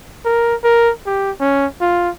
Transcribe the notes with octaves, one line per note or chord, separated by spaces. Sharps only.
A#4
A#4
G4
C#4
F4